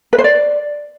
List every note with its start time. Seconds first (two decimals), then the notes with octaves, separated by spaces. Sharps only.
0.13 B4
0.18 C5
0.24 D5